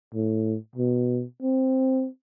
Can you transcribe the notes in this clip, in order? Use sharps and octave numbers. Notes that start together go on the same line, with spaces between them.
A2
B2
C4